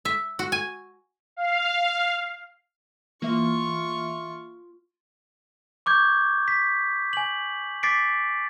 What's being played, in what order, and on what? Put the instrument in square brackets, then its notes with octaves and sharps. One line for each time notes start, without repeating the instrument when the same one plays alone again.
[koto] E5
F#4
G#5
[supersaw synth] F5
[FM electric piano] E3 E5 [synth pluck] A#3 [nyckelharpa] F4 C#6
[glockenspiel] C#6 D6 G6 G#6
B6
G#5 F#7
D6 A6 B6 C7 D7